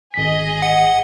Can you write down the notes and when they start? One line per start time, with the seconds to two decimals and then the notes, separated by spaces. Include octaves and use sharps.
0.14 G#1 G#4 D#5 B6
0.62 F#5